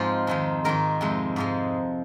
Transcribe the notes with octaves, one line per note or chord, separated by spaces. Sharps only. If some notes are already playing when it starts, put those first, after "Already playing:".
Already playing: G#2 F3 G#3 C4 F4
F2 D#3 G#3
G#2 D#3 G#3 A#4
F2 C3 G#3
G#2 F3 G#3